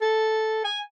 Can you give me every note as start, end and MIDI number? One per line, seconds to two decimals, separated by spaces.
0.02 0.61 69
0.65 0.80 80